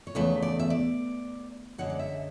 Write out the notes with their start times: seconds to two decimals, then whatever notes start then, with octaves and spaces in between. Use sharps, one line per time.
0.07 C#5
0.15 E2 C#3 E3 A3 B4
0.42 D5
0.59 E5
0.70 D5
1.78 F#2 D3 G#3 F#5
1.90 D5
1.99 E5